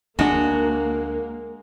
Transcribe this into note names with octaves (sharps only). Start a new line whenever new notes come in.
D2 G#3 A#3 D4 F#4 C#5